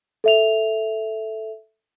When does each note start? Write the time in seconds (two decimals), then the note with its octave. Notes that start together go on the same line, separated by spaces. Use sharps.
0.24 A4 E5 F7